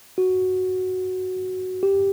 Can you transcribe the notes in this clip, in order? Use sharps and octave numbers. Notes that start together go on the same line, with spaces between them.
F#4
G4